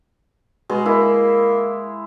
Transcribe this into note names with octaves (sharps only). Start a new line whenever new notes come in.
B2 G#3
A#3 E4